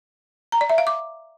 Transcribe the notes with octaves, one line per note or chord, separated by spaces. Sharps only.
A#5
D5
E5
F5
D6